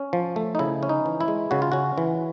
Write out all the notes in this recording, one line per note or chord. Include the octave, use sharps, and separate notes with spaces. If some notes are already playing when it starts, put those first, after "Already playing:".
Already playing: C#4
F3
A3
D#4
C#3 E4
C#4
D#4
E3
E4
G#3
C#3 F#4
F4
C#4 F#4
E3